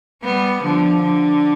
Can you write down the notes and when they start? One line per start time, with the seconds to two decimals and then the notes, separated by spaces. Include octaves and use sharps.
0.24 G3 B3
0.63 D3 F3
1.02 D3